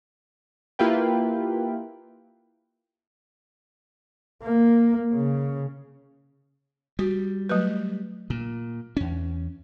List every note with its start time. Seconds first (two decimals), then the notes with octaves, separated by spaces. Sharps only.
0.79 A#3 E4 F4 G4 B4 G5
4.43 A#3
5.13 C#3
6.99 G3 F#4
7.49 F#3 A3 B4
8.30 A#2
8.97 E2 C#4